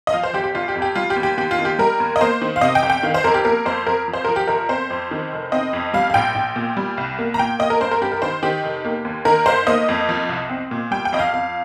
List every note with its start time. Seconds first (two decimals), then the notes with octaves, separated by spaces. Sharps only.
0.07 D#5
0.13 F3 F5
0.23 C5
0.33 G1 G4
0.44 G4
0.55 G1 F4
0.68 G4
0.75 F2
0.82 G4
0.95 G3 F4
1.10 G4
1.16 D#2
1.23 G4
1.37 D#2 G4
1.51 F4
1.59 D#3
1.65 G4
1.79 G3 A#4
2.00 D#2
2.16 D#5
2.21 A#3 C5
2.42 D#3
2.56 F5
2.61 C3 D#5
2.75 G5
2.82 G1
2.90 G5
3.03 D#3 F5
3.14 C5
3.24 F2 A#4
3.34 G4
3.44 A#3 A#4
3.65 F2 C5
3.87 F2 A#4
4.08 F3
4.13 C5
4.25 F3 A#4
4.36 G4
4.47 G1 A#4
4.69 C4 C5
4.90 F2
5.11 D#3
5.32 F1
5.52 C4 D#5
5.73 F2
5.94 G3 F5
6.10 F5
6.14 A#1 G5
6.35 A#1
6.56 A#2
6.77 G3
6.98 C2
7.19 A#3
7.34 A#5
7.39 A#2 G5
7.59 A#3 D#5
7.70 A#4
7.81 G2 C5
7.91 A#4
8.01 G2 G4
8.12 A#4
8.22 D#3 C5
8.43 D#3 G4
8.63 F1
8.85 A#3
9.05 D#2
9.25 D#3 A#4
9.46 G1 C5
9.67 A#3 D#5
9.88 F2
10.09 F3
10.29 C2
10.50 C4
10.71 A#2
10.91 G3 G5
11.05 G5
11.12 F2 D#5
11.19 F5
11.32 F2 F5